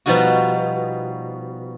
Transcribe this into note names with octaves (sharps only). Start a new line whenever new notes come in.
B2 F3 G3 D#4 F#4